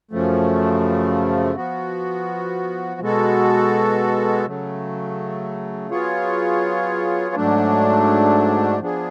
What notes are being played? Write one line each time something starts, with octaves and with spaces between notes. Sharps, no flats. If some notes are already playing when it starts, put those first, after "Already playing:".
F#2 C#3 F3 A3
F3 B3 F#4
B2 G#3 B3 F#4 A4
C#3 F#3 A3
F#3 B3 F4 G#4 C#5
G#2 F#3 A3 D4
F3 B3 D4 G#4